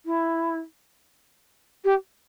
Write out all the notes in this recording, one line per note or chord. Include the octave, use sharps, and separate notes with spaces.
E4
G4